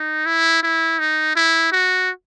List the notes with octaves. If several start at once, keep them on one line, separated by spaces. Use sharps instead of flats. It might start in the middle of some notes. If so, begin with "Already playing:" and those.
Already playing: D#4
E4
E4
D#4
E4
F#4